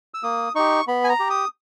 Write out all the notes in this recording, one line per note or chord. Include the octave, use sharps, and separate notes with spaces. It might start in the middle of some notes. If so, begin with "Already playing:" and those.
E6
A#3 D#6
D#4 G4 C#6
B3 B5
G#5
A#5
G4
D#6